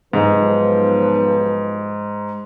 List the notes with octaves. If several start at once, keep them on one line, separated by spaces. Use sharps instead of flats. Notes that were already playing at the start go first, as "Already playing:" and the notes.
B1 G#2 F3 B4